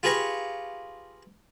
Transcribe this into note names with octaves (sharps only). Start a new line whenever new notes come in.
F4 G4 G#4 B4 A#5 C#6